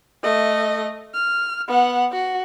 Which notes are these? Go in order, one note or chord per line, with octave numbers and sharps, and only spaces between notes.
A3 D#5
F6
B3 F#5
F#4